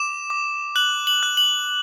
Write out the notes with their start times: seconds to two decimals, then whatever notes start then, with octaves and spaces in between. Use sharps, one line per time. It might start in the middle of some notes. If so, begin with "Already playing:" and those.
Already playing: D6 E7
0.30 D6
0.76 F#6 F#7
1.07 F#7
1.23 F#6
1.37 F#7